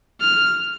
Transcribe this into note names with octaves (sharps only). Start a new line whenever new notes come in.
F6